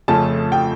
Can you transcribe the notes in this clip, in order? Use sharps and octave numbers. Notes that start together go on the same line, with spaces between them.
F2 C#3 F3 A3 C#4 A5
G5